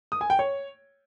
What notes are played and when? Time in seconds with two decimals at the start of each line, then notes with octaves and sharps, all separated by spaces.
0.12 D#6
0.21 G#5
0.30 G5
0.39 C#5